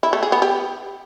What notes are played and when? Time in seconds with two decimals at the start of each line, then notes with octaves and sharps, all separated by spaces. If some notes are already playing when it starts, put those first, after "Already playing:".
0.03 E4
0.13 A3
0.23 G#4
0.32 B3
0.42 G4